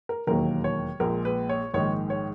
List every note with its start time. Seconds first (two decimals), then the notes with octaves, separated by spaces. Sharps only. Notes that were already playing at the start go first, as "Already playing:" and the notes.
0.09 A#4
0.27 E1 D#2 D#3 F#3 A#3 A#4
0.64 C#5
1.00 A#1 A#2 G#3 A#4
1.25 B4
1.49 C#5
1.74 A#1 G#2 D#3 G#3 C#5
2.10 C#5